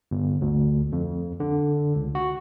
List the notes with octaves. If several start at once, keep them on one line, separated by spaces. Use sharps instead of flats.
G1
D2
F2
D3
C#2
F#4